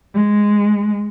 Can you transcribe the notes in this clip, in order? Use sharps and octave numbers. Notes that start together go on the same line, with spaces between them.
G#3